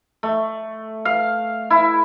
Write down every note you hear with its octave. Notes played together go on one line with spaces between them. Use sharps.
A3
F5
E4